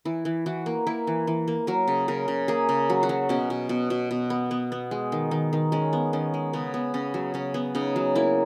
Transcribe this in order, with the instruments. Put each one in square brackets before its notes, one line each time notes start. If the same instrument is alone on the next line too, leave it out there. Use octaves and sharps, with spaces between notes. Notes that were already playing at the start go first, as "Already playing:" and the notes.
[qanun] E3 E4
E3
E3 F#4
A#3
A#3 E4
E3
E3
A#3
F#3 A#4
C#3
C#3 A#4
C#3
A#3 G#4
C#3
F#3
F#4
F#3
B2 C#4
B2
B2
B2
B2
B3
B3
B3
G#3
D#3
D#3
D#3
G#3 C#4
B3
D#3 C#4
G#3
C#3 B3
B3
C#3 C#4
F#3
C#3 C#4
B3
C#3 D#4
F#3
A#3 E4